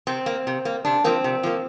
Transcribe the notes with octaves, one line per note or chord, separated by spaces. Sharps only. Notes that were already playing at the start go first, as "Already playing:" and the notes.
C3 C4
A#3
C3
A#3
C3 D4
F3 A#3 C4
C3
F3 A#3